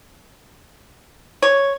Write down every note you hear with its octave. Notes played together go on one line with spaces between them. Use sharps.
C#5